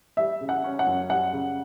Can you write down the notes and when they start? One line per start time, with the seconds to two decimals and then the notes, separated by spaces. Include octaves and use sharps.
0.17 G3 E5
0.41 C#3
0.49 F#5
0.64 C#4
0.79 F#5
0.87 F#2
1.10 G3 F#5
1.33 C#3